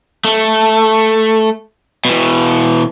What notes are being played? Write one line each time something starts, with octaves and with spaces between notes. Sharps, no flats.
A3
B2 E3